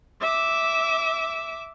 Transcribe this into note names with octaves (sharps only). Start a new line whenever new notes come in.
E5 D6 E6